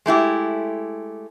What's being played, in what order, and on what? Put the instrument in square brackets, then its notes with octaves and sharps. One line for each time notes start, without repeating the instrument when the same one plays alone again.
[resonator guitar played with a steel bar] G#3 A3 E4 G4